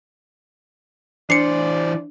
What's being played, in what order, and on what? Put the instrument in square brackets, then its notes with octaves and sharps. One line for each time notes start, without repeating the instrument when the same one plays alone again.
[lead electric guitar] E3 C5 [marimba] D4 [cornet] D5 [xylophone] C7 C#7